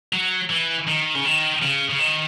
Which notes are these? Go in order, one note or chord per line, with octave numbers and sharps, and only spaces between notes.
F#3
E3
D#3
C#3
D#3
C#3
C#3
D#3